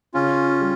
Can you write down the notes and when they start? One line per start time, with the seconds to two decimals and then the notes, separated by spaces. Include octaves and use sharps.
0.14 C#3 C#4 F4
0.60 G3